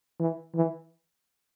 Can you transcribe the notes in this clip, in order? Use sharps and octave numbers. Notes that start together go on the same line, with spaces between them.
E3
E3